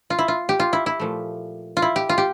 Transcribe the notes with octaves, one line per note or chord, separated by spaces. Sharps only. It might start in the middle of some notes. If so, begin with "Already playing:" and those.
F4
E4
F4
G4
F4
E4
E4
A#2 F3 A3
F4
E4
G4
F4
G4